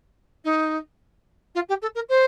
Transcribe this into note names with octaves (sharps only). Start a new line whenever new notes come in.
D#4
F4
G4
A4
A#4
C5